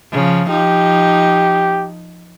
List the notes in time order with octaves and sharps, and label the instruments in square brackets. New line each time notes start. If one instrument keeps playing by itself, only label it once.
[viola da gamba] C#3 F3
[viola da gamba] F3 D#4 [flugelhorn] G4